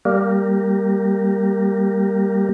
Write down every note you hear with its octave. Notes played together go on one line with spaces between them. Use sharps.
G3 A#3 G4 A#4